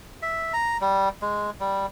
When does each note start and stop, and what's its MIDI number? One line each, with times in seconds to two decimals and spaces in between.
0.22 0.53 76
0.53 0.77 82
0.81 1.09 55
1.22 1.50 56
1.60 1.86 55